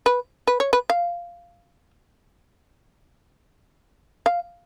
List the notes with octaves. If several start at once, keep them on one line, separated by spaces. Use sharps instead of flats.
B4
B4
C#5
B4
F5
F5